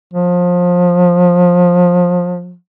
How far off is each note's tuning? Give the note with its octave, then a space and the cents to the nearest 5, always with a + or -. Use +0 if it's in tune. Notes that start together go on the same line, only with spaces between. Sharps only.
F3 +25